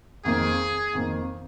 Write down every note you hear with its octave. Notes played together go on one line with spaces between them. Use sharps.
F2 D#3 A#3 G#4
F2 D#3 A#3